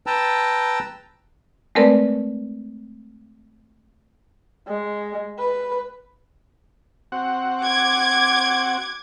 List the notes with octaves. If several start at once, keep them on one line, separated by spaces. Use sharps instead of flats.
B4 G5 A5 A#5 E6
G#3 A3 C4 A#4 B4 D5
G#3
B4
C4 F#4 F#5
D6 G#6